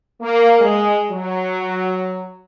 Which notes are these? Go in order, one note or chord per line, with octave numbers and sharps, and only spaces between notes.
A#3
G#3
F#3